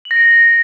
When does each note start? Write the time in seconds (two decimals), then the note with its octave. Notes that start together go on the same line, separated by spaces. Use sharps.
0.05 F#7
0.11 A#6
0.16 D7
0.22 A#6